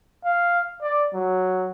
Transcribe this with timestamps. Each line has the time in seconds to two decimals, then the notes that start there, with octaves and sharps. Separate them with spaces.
0.25 F5
0.82 D5
1.14 F#3